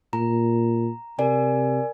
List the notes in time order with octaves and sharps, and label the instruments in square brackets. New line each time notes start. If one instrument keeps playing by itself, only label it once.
[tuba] A#2 [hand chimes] A#5
[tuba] C3 [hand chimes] A#4 D5 G#5